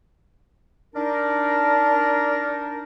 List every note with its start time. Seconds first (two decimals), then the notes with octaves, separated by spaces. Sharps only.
0.95 D4 D#4 A#4